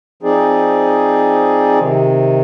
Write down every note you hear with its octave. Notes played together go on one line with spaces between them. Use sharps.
F3 C4 D#4 G#4 D5
C3 D#3